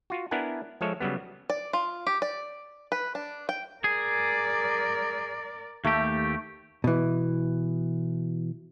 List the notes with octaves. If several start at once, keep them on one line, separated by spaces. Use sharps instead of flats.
F4 F#4
B3 D4 E4 A#4 F#5 G#5
F3 G#3 A4 C#5 E5
C#3 F#3 G3 B3
D5
F4
G4
D5
B4
D4
G5
G#4 A#4 D5
D#2 A3 G4
B2 E3